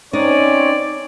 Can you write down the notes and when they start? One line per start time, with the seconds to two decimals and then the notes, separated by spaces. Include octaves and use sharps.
0.13 C4 C#4 D#4 C#5 D5